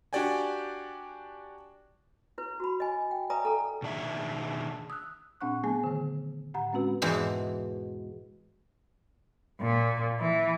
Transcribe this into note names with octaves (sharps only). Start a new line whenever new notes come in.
D4 F#4 G4 D5 G5 G#5
E4 B4
F#4 B5
D#5 G#5
G5
B4 D5 E5 G#5 A#5 D#6
A4 A#5
B2 D#3 D4 G#4 E5
D#6 E6 F#6
A#2 C4 D4 F#5 C#6 F#6
F#3 A3 B3 G#4 G#5
D3 D#3
A2 F#5 A#5
G#3 C4 C#4 F#4 B4
E2 G#2 B2 E3 C5
A#2
E3